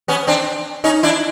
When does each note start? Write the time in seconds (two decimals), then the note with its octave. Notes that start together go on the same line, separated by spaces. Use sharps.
0.08 B3 C#4
0.27 C4 D4
0.84 C#4 D#4
1.03 D4 E4